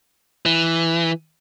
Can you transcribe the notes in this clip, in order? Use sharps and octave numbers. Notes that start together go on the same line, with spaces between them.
E3